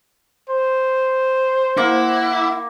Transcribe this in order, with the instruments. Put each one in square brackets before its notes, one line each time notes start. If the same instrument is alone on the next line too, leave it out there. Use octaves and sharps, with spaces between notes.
[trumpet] C5
[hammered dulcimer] A#3 [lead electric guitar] E4 [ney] F#5